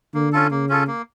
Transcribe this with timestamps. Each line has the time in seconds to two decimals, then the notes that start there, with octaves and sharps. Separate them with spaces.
0.14 D3 A#3
0.32 C#4 F4 A4
0.51 C#3 A#3
0.69 C#4 F4 A4
0.87 A#3